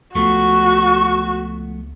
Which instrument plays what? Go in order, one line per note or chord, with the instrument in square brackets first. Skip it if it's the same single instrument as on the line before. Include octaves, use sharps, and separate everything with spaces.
[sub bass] C#2 [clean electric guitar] F3 A3 B3 [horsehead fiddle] F#4 [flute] C#6